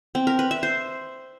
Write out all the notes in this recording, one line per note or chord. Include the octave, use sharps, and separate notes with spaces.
C4
A#4
B4
E5
C5